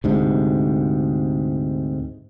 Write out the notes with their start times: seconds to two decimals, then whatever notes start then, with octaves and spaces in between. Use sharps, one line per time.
0.04 D2 G#2 C3